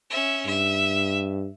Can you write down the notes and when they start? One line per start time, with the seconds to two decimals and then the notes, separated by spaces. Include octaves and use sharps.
0.10 C#4 E5
0.47 G2 E5